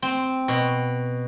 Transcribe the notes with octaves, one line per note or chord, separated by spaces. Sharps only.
C4
B2